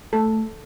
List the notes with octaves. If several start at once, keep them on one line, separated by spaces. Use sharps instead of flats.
A3 A4